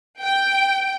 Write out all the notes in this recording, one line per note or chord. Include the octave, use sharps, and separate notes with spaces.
G5